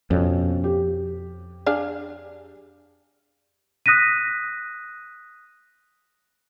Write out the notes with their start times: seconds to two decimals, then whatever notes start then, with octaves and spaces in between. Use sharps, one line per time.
0.11 F2 B2 C#4
0.64 G4
1.66 D4 G#4 F5
3.86 D#6 F#6 A#6 B6 D#7